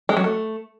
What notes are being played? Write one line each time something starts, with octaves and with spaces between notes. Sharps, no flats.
G#3
F#3
A3